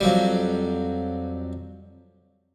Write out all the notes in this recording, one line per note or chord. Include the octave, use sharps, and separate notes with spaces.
F2 F#3 G3